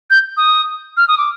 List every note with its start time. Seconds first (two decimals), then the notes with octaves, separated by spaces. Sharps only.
0.10 G6
0.37 D#6
0.97 F6
1.08 D#6
1.18 D6